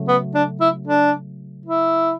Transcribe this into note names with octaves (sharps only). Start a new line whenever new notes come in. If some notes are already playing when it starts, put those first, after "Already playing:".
Already playing: C#3 F#3 A3
B3
D4
E4
D4
E4